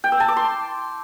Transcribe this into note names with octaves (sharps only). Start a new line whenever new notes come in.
G5
E6
A5
D6
C6